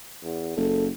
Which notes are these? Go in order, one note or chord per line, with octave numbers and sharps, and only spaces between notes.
E2
F#1 A4